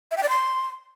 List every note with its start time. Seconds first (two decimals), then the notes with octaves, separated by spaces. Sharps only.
0.11 E5
0.17 G5
0.23 D5
0.29 C6